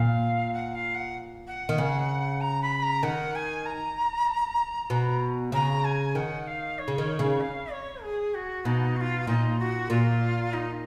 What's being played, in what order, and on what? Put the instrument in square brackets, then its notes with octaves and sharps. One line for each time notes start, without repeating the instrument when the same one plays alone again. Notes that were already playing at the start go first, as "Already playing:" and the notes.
Already playing: [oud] A#2 [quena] F5
[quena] F#5
F5
F#5
F#5
[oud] D#3
C#3
[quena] A#5
B5
A#5
[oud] D#3 [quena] F#5
[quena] G#5
A#5
[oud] B2
[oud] C#3 [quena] A#5
[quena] G#5
[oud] D#3 [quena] F#5
[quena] F5
C#5
[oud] C#3
D#3
C#3
[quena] F5
C#5
G#4
F#4
[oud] B2 [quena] D#4
[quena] F#4
F4
[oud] A#2 [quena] D#4
[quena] F#4
[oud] A#2 [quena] F4
[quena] D#4